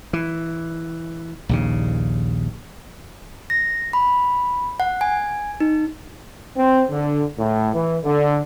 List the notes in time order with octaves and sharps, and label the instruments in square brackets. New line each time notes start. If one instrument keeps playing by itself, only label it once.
[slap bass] E3
A#1 D#2 C#3
[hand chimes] A#6
B5
F#5
G#5
D#4
[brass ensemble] C4
D3
A2
E3
D3